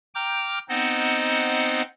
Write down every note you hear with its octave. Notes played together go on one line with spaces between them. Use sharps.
G5 A#5 D6 F6 G6
B3 C4 D#4 C5 D#5 F#5